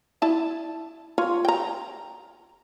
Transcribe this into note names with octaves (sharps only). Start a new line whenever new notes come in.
E4 D5 A5
F4 C#5
G5 A#5